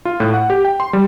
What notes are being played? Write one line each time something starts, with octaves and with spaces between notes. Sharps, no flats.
F4
A2
F#5
G4
G5
C6
G3